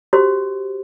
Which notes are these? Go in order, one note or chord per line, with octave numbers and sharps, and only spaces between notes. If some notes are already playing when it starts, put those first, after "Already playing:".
F#4 G4 C5